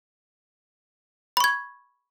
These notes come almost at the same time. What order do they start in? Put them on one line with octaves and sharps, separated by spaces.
B5 C#6 G#6